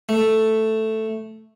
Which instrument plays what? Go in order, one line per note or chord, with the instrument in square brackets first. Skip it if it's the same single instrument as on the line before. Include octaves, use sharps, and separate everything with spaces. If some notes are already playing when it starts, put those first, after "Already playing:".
[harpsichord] A3